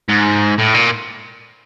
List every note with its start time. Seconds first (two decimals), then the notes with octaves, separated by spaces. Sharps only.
0.09 G#2
0.58 A2
0.74 A#2